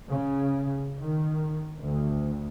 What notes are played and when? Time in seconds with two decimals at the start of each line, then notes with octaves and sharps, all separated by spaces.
0.10 C#3
1.00 D#3
1.81 D2